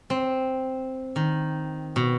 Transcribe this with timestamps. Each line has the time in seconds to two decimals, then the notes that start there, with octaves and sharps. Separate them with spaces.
0.10 C4
1.16 D#3
1.96 B2